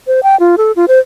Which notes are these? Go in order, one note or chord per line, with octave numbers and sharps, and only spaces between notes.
C5
G5
F4
A4
F4
C5